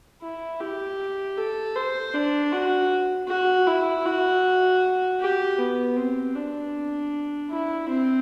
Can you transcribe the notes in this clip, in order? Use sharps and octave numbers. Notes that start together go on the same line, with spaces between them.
E4
G4
A4
C5
D4
F#4
F#4
E4
F#4
G4
B3
C4
D4
E4
C4